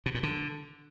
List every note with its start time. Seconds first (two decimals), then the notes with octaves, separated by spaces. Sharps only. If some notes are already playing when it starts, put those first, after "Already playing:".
0.06 B2
0.15 A#2
0.23 D3